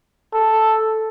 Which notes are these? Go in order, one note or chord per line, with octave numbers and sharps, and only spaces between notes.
A4